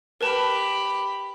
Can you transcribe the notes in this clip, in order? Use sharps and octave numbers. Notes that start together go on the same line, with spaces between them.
G4 A#4 B4 A5 B5